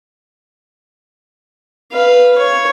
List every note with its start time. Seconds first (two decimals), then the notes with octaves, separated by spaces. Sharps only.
1.92 B4 F5
2.38 C#5